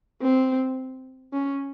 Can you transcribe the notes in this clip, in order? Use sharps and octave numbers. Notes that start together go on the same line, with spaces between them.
C4
C#4